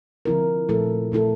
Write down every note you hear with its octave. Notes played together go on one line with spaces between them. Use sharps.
D3 F3 C4 E4 A#4
A#2 F3 A3 E4 A4
A#2 F3 A3 E4 A4